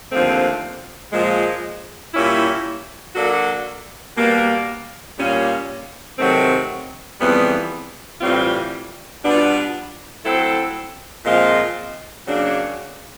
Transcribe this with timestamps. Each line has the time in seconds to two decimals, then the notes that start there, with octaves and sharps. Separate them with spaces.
0.11 D#2 D3 F3 A3 C4
1.13 A#2 F3 G#3
2.14 A#2 G3 A#3 C#4 E4
3.15 F#3 A#3 D4 F#4 A4
4.17 B2 G3 A#3
5.17 A#2 G3 A#3 C#4
6.19 C3 D#3 F#3 A3 C4
7.20 F2 C#3 E3 G3 B3
8.21 A2 E3 G3 C4 F4
9.23 B2 G3 B3 D4 F4
10.24 F#3 A3 C4 E4 A4
11.25 A#2 F3 G#3 C4 F4
12.26 C#3 F#3 A#3 D4